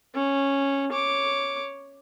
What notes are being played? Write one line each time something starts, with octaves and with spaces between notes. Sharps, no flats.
C#4
C#5 D6